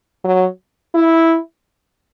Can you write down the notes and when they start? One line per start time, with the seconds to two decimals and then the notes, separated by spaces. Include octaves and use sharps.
0.24 F#3
0.94 E4